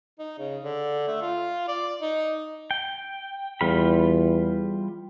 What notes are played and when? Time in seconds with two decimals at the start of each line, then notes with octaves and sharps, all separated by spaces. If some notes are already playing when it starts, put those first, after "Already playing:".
0.19 D#4
0.39 C#3
0.64 D3
1.08 A3
1.22 F4
1.68 D5
2.02 D#4
2.71 G5
3.61 E2 G3 F4 B5